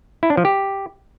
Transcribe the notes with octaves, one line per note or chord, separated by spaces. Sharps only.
E4
D4
F3
G4